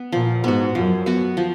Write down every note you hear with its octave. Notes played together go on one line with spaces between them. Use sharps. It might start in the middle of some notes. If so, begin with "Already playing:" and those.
Already playing: B3
A#2 F3
G#2 B3 F#4
F#2 F3
B3 F#4
F3